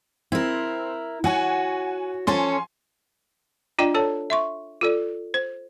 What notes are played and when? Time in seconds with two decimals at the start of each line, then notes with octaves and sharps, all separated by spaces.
0.32 C4 E4 A#4
1.24 F#4 C#5 F#5 G#5
2.27 F3 C#4 A4 C#5 G#5 C6
3.79 D4 F4 D5 D#5 G5
3.94 A4 C#5 A5
4.30 E5 C6 C#6
4.81 F4 A4 D5
5.34 C5